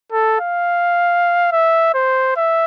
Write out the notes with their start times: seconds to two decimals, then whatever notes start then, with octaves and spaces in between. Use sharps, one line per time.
0.12 A4
0.40 F5
1.52 E5
1.94 C5
2.36 E5